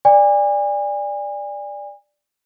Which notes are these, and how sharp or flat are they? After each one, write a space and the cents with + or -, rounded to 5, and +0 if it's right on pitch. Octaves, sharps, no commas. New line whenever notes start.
D5 +0 G#5 -35